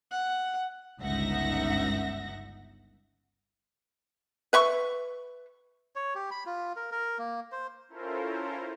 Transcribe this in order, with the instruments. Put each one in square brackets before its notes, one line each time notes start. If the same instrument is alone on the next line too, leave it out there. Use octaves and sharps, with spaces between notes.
[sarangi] F#5
[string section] G1 C#2 D#4 E5 F#5 A#6
[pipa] B4 E5 C#6
[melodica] C#5
G4
B5
F4
A#4
A#4
A#3
C5
[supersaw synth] C#4 E4 F4 A4 A#4 C5